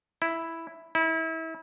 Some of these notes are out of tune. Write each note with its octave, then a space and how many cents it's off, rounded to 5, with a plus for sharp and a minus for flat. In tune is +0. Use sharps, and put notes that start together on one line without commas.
E4 +0
E4 -30